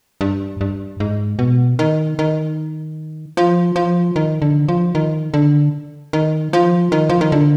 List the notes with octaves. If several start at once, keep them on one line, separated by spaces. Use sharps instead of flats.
G2
G2
G#2
B2
D#3
D#3
F3
F3
D#3
D3
F3
D#3
D3
D#3
F3
D#3
F3
D#3
D3